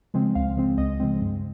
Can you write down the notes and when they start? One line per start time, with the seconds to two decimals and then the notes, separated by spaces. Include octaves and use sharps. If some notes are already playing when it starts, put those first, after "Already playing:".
0.14 C#3 F3 G#3 C4
0.35 C#2 F5
0.57 C#3 F3 G#3 C4
0.78 C#2 D#5
1.00 C#3 F3 G#3 C4
1.21 G2